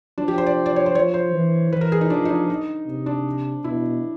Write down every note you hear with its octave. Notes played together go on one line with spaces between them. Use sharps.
F3 D4
G4
C5
D5
D5
C#5
C5
F3 C#5
C5
E3
E3 B4
A#4
G#4
D#4
F3 D4
D#4
D4
D#4
C3
D4
B2 E4